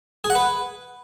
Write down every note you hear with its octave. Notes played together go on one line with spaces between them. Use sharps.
G#4
F#5
B4